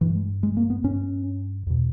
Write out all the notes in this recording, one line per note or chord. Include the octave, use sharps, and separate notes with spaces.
G2 E3
G#3
G#3
A#3
B3
G2 C#4
E2 B2